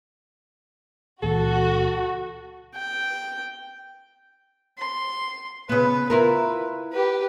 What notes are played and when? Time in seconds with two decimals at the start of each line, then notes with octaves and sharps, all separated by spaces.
1.22 C#2 A#2 E3 F#4 A4
2.75 G5
4.78 C6
5.69 C#3 B3 B4
6.10 E4 F4 A#4 B4
6.92 G4 B4